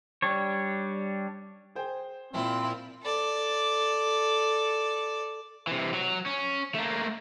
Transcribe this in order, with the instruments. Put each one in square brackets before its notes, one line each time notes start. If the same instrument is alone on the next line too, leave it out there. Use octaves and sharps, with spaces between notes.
[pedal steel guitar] G3 D4 C#5
[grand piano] G#4 C5 G5
[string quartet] A#2 E4 F4 [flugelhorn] C4
[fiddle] A4 D5
[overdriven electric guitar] C3 E3
F#3
C#4
A3 A#3